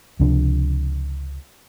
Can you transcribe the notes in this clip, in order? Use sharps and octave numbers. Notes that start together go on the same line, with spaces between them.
C#2 C3 F3 D4